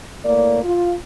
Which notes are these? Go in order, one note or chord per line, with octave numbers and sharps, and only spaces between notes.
A2 A#3 D5
F4